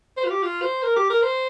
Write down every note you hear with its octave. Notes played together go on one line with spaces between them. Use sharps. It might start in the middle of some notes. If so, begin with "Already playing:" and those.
C5
F4
G4
F4
C5
A#4
G4
A#4
C5